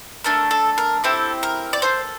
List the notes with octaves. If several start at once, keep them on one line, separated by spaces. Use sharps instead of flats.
A3 D4 A4 A#4
A4
A#4
C4 E4 G4 A4
A#4
D5
A#3 F4 A4 C5